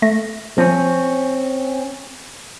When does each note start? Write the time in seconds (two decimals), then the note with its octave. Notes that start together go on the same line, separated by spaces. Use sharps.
0.02 A3 A#6
0.58 F3 C4 C#4